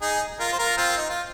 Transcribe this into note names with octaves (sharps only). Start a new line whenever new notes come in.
D#4 G#4
F4 A#4
C5
F4 A#4
C4 F4
D#4
F4